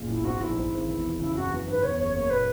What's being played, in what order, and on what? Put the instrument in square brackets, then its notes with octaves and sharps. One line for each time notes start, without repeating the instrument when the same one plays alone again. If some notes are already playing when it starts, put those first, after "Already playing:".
Already playing: [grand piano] F#1 A#2
[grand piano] B1 [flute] E4
[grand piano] G#2 [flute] F#4
[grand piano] A#1 [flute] E4
[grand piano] G#2
G#1
E2
E1
[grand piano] C#3 [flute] E4
[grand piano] F#2 [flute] F#4
[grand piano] E3
[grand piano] G#2 [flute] B4
[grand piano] E2 [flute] C#5
[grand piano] F#1 [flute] C#5
[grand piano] A#3 [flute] C#5
[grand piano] A#2 [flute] B4